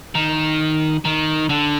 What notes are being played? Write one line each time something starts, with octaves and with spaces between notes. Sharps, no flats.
D#3
D#3
D3